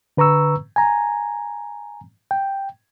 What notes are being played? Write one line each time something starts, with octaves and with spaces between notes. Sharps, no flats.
D3 B4 A#5 C#6 E6
G#5 A#5
G5